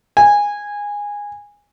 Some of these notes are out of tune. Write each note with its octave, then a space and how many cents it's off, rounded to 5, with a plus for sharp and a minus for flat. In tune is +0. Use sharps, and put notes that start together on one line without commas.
G#5 -15